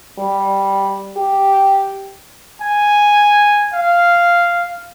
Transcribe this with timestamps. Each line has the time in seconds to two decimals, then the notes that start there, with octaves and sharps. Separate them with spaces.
0.18 G3
1.16 G4
2.62 G#5
3.74 F5